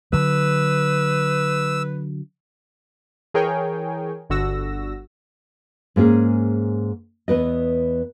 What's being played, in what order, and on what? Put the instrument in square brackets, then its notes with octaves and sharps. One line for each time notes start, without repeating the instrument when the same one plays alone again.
[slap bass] D3 F#3 [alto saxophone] B4 [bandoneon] E6
[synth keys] E3 G#4 A#4 C#5 G5 G#5
G1 D3 F#4 E6 A#6
[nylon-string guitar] G#2 A#3 C#4 G#4
E2 B3 B4 D#5